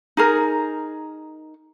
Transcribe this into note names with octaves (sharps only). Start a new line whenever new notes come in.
D#4 G#4 A#4